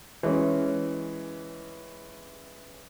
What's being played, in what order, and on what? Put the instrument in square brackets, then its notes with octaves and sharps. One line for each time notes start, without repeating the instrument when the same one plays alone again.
[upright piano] E3 G#3 C#4